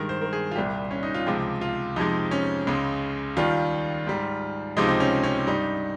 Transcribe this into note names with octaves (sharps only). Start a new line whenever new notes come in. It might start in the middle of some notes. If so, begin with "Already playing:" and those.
Already playing: G2 D#3 G#3 A#4
C5
A#4
G#4
F4
C2 A#2 G3 G4
C#4
D#4
F4
C#2 C3 F3 G#3 G4
F4
F2 C3 F3 G#3 D#4
C#4
C#2 C#3 G#3
D#2 D#3 G3 F4
G#2 G3
C#2 C3 F3 G#3 D#4
C4
C#4
C#4
G2 G3 D#4